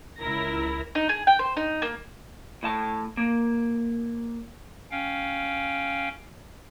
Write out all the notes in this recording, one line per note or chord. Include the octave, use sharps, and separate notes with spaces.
C#2 E4 A#4 A#6
D#4
G#4
G5
C5
D#4
A#3
A2 A5
A#3
C#4 F5 G5